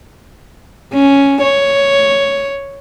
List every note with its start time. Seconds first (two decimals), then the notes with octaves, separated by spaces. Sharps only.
0.93 C#4
1.42 C#5